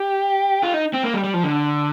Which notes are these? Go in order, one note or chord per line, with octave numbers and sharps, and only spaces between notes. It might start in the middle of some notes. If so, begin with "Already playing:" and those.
Already playing: G4
F4
D#4
C4
A#3
G3
G3
F3
D3